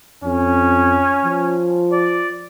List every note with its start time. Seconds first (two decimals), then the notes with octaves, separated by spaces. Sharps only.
0.24 F2 C#4
1.25 F3
1.92 D5